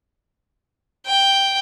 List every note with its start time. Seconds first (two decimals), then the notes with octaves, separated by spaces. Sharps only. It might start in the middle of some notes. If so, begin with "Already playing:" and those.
1.07 G5